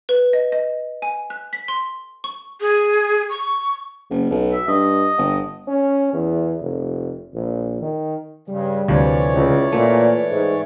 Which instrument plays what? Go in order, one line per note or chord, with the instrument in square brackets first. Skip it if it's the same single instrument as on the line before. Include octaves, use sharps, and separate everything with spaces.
[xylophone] B4
D#5
D#5
G#5
F#6
B6
C6
C#6
[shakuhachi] G#4
C#6
[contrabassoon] F#1
B1
[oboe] E5
[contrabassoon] G2 [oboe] D#5
[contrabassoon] G1
[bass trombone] C#4
E2
F1
A#1
D#3
[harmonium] G2 C#3 [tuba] G3
[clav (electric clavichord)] D2 C3 F3 [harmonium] E3 C#5 D5
[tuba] C#2
[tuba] A#2 [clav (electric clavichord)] A3
[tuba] G#2